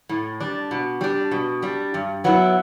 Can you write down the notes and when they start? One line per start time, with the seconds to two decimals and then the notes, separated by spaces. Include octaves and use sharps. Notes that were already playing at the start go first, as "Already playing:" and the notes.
0.09 A2
0.40 G3 D4
0.71 B2
1.01 G3 D4
1.31 B2
1.62 G3 D4
1.94 G2
2.24 F#3 B3 E4